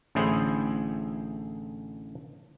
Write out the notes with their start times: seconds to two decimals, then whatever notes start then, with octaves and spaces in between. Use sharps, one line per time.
0.15 A1 A2 D3 E4 G#4 C5